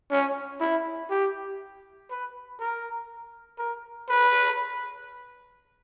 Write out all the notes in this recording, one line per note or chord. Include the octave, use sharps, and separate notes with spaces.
C#4
E4
G4
B4
A#4
A#4
B4